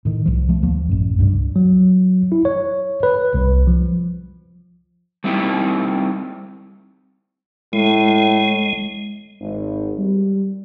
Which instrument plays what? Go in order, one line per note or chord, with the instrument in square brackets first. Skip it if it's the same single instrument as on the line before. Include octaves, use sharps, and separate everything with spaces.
[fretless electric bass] A2 D#3
C2 F3
F3 A3
D2 F3 A#3
A1 F#2
C#2 G2 C3 G3
[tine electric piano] F#3
E4
C#5
B4
C2
F3
[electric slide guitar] G3 A#3 C4 D#4 E4 G4
[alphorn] A2 [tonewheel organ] G#3
[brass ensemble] G#1
G3